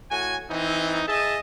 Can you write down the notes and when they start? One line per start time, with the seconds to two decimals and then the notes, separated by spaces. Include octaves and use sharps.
0.11 A2 F#4 G#5
0.51 E3 C4 D#4
1.08 G#4 D#5 E5 A5